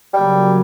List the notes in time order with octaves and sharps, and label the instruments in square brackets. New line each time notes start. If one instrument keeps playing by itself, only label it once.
[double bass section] C#3 F#3 A#3 [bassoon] G3